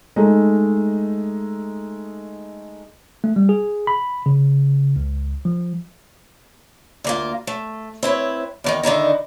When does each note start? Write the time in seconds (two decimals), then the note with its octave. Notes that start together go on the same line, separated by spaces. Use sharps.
0.16 G#3 A3 D#4 A4
3.24 A3
3.36 G3
3.49 G#4
3.87 B5
4.26 C#3
4.96 C#2
5.45 F3
7.04 D2 A#3 F4
7.47 A3
8.03 C4 E4 B4 C#5
8.64 E2 D#3 D#4
8.83 D3 D#3 D#4 E4